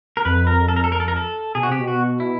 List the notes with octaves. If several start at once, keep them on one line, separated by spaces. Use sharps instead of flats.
A#4
F2 B4
A#4
A4
A#4
A4
A#4
A4
A#4
A4
B2 G#4
F#4
C3 G4
B2
F#4
E4